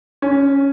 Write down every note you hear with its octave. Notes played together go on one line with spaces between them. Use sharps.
C#4